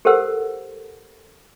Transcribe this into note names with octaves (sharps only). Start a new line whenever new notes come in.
G4 A4 A#4 C5 F#5 E6